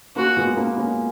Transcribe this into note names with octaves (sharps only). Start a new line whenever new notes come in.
A#3 C#4 F#4
G#3 B3
A#3 C#4
A#3 C#4